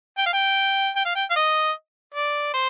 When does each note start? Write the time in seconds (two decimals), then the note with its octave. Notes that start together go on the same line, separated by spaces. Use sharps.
0.17 G5
0.26 F5
0.33 G5
0.96 G5
1.05 F5
1.15 G5
1.30 F5
1.36 D#5
2.14 D5
2.54 C5